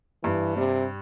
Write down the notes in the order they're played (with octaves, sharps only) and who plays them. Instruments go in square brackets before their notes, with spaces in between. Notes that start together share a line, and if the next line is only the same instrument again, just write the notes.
[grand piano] G2 [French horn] E3
[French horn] C3 [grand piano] G3